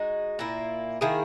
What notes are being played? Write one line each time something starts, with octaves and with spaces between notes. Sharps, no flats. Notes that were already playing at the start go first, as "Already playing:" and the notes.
Already playing: G#3 D#4 F#4
A#2 A#3 E4
D#3 A#3 E4 G#4